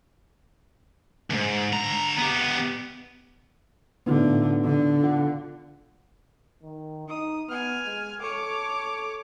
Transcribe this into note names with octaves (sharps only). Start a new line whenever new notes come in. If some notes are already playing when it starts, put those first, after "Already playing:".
C#2 G#2
D3 A#5
B3 G4
A2 D3 B3 D#4 F4
D3
F4 F#5
D#3
D#4 D#6
B3 G#5 F6
G#3
A4 C#5 D6